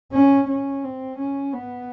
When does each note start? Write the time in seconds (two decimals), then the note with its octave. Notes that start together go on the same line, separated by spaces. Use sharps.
0.13 C#4
0.48 C#4
0.83 C4
1.18 C#4
1.53 B3